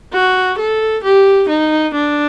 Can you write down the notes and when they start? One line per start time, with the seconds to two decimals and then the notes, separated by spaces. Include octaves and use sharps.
0.13 F#4
0.58 A4
1.03 G4
1.48 D#4
1.95 D4